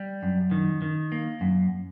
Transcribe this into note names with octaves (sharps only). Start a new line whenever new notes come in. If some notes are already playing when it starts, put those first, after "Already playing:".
Already playing: G3
F#2
D#3
D#3
A#3
F#2